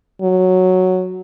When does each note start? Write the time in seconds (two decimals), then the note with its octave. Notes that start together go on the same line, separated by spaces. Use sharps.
0.22 F#3